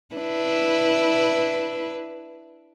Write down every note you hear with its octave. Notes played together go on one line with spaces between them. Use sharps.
D4 E4 B4